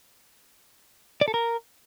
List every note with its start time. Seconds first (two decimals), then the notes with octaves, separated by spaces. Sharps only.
1.21 D5
1.28 A4
1.34 A#4